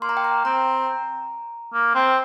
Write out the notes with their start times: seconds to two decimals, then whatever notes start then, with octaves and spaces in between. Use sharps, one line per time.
0.02 A#3 C6
0.09 A#5
0.17 G5
0.25 A#5
0.45 C4 A#5
1.74 A#3
1.95 C4